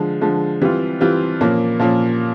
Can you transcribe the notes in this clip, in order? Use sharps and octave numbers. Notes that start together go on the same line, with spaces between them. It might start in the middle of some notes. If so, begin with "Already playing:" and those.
Already playing: D3 F3 G#3
D3 F3 G#3
E3 G3 C4 F4
E3 G3 C4 F4
A#2 F3 A#3 C#4
A#2 F3 A#3 C#4